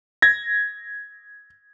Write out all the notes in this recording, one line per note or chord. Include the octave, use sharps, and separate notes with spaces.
G#6 A#6